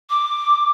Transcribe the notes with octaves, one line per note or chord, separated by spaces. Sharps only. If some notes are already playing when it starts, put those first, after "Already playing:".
D6